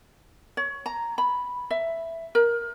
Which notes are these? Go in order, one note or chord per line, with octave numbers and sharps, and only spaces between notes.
C#5
A#5
B5
E5
A#4